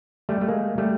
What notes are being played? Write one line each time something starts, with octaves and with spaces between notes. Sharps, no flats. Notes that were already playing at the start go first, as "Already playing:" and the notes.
G3 A3
A3
G#3 A#3
G3 A3